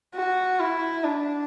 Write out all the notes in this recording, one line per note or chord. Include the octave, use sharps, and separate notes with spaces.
F#4
E4
D4